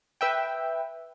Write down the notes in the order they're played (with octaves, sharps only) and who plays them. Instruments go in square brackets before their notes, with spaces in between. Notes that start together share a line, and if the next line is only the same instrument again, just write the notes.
[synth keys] B4 E5 G5